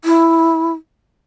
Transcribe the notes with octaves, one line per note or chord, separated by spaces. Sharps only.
E4